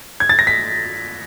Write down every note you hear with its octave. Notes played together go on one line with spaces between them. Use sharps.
G#6
A6
A#6
B6